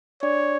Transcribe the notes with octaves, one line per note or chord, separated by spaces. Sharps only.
D4 C#5 D5